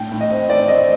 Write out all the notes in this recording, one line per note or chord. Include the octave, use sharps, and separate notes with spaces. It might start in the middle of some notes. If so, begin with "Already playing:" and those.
Already playing: A2 D4 G5
A2
D#5
C4
A3 D5
C4 D#5